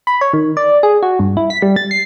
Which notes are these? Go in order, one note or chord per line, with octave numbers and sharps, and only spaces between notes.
B5
C#5
D#3
D5
G#4
F#4
G2
E4
B6
G3
A6
C7